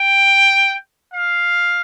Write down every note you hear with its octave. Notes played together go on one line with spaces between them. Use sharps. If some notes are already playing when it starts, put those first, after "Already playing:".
Already playing: G5
F5